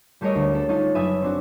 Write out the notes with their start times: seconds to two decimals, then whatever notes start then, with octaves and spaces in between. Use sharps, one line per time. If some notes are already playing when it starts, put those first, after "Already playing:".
0.21 G3 A3 G#4 A#4 C#5 D#5
0.35 D2
0.53 C#4 A4
0.69 C#4 D#4 F4 A4
0.95 F#1 B4 E5 G#5 D#6
1.22 C4 D4 F#4